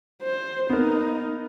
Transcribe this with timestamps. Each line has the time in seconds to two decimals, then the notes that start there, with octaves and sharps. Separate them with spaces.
0.23 C5
0.70 A#3 B3 D#4 A#4